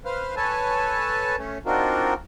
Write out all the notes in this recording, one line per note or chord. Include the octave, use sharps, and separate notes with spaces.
B4 C5 F5 F6
A4 B4 C#5 G#5 A5
A3 C#4
C4 D4 D#4 F4 F#4 A#4